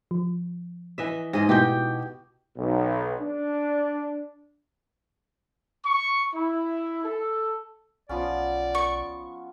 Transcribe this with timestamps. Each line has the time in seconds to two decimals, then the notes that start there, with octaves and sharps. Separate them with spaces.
0.11 F3
0.98 E3 D#5 E5
1.33 G#2 G#4 D#5 A#6
1.49 B2 E4 F#4 G4 G6
2.56 B1
3.20 D4
5.84 C#6
6.34 E4
7.03 A4
8.09 B1 F3 B3 C#4 D5
8.75 C#6